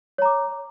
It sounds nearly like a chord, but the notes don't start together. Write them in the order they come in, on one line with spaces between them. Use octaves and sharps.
C#5 A#5 D6